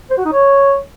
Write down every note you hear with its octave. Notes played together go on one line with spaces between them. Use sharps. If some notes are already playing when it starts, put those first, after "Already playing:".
C5
F#4
D#4
C#5